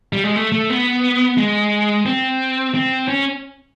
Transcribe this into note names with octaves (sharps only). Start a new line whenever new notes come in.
G3
G#3
A3
A3
B3
G#3
C4
C4
C#4